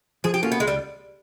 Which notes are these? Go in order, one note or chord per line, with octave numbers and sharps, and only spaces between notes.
F3 G#4
G4
A#3 C#4 F4 F#4 A4
B3
C#2 G#3
G3